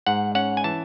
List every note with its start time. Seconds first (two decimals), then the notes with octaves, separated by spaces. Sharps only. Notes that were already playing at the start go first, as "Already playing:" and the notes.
0.07 G#2 F#5
0.35 C#4 F#5
0.57 G#5
0.64 E3 A5